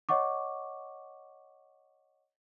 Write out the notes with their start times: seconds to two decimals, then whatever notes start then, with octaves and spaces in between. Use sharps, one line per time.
0.09 C#5 D#5 F#5 C#6 D6